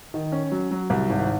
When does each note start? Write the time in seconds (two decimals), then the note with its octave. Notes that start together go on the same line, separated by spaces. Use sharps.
0.14 D#3
0.32 C#4
0.52 F#3
0.71 F#3
0.90 C2
1.10 G#1